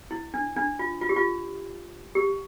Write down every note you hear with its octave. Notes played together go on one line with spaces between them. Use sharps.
E4
D4
D4
F4
F4
G4
F4
G4